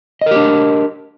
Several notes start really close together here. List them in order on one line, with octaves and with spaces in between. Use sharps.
D#5 A#4 G4 D4